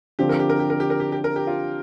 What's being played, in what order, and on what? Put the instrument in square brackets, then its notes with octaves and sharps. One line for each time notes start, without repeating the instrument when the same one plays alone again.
[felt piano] D3 F3 C4 [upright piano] G4
[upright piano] A#4
G4
A#4
G4
A#4
G4
A#4
G4
G4
A#4
G4
F4